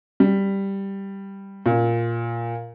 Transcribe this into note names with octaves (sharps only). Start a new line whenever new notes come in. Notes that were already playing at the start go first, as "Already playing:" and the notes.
G3
A#2